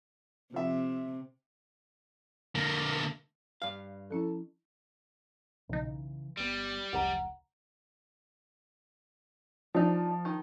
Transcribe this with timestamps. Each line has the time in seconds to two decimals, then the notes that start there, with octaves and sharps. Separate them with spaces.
0.54 C3 F3 E5
2.55 D3 A#3
3.62 G2 F5
4.11 F3 C#4 E4 A4
5.69 B1 C#3 E3 D#4
6.37 G1 G3 B3
6.93 F1 C#2 F#5 A#5
9.75 F3 D4 D#4
10.25 D#3